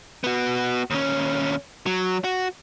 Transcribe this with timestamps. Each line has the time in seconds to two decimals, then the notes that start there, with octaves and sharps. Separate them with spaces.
0.24 B3 F#4
0.90 D#2 C#4
1.86 F#3
2.24 F#4